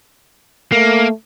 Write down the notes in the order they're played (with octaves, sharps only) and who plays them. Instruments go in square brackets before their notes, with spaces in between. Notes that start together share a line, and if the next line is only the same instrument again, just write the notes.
[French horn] A3 [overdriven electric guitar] A#3